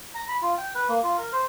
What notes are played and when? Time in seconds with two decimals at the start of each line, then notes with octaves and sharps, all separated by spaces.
0.15 A#5
0.29 B5
0.42 F4
0.58 G5
0.75 B4
0.89 A#3
1.03 F4
1.18 A#4
1.32 C5